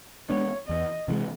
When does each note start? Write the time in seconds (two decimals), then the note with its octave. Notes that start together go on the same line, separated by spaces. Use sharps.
0.30 G#3 B3 D4 C#5
0.68 E2 D#5
1.08 C3 E3 G#3